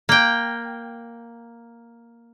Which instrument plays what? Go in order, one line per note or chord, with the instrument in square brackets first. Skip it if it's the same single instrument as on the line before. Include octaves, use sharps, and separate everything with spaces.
[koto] A#3 G5